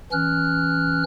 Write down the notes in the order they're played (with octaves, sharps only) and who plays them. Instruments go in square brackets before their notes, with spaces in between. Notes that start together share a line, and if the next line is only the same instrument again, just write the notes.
[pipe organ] E3 C#4 F6 F#6